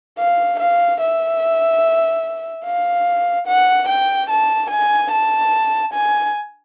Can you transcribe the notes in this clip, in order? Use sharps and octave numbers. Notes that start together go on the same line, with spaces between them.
F5
F5
E5
F5
F#5
G5
A5
G#5
A5
G#5